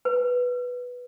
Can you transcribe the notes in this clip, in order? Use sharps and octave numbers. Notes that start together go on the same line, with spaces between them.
B4